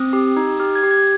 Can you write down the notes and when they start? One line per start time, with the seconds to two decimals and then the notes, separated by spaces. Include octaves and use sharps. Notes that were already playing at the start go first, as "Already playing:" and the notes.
Already playing: C4 D#6
0.13 G4
0.37 D#4
0.60 G4 F6
0.75 G#6
0.83 G4
0.91 G#6